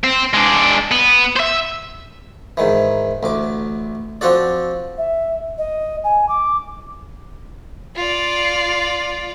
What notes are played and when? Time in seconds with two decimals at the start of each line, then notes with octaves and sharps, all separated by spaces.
0.04 C4
0.33 G#3 D4
0.91 B3
1.36 C5 E5
2.57 G#2 D#3 E3
3.23 A1 D2 D6
4.21 F3 C4 D4 F#4 A4 D5
4.98 E5
5.58 D#5
6.04 G#5
6.29 D6
7.96 F4 D5